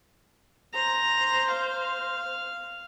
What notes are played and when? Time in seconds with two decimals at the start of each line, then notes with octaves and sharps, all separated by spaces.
0.74 C5 A#5
1.52 F5